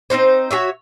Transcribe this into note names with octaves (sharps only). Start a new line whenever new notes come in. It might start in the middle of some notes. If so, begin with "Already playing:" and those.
C4 C#4 D#4 C5
F#4 G#4 C#5 E5